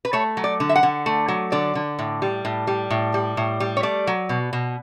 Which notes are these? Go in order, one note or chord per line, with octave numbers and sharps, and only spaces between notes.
B4
A3 C#5
F#3
D5
D3
E5
F#5
D3
A3
F#3
D3 D5
D3
A2
G3
A2
G3
A2
G3
A2
G3
C#5
A3 D5
F#3
B2
B2